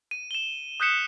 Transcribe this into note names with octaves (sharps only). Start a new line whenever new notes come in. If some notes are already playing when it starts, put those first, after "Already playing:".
D#7
E7 G7
D#6 F#6 G6 B6 C#7 E7